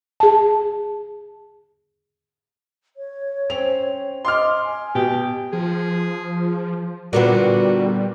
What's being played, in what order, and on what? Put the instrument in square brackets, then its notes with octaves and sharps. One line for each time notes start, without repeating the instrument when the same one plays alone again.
[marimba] G#4 A5
[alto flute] C#5
[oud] C4 C#4 [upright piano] F7
[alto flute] D#5 [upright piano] C6 D6 F6
[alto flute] G#5
[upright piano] B2 [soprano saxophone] G4
[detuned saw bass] F3 [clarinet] G#4
[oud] A#2 D3 B3 [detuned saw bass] G3 [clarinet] F#4